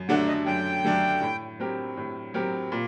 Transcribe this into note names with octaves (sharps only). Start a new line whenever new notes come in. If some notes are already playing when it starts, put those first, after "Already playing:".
Already playing: F#2
D3 F#3 A3 D4 F#5
D#5
F#2 G5
D3 F#3 A3 D4
A2
F#3 C4 G4 A#4
A2
F#3 C4 G4 A#4
A#2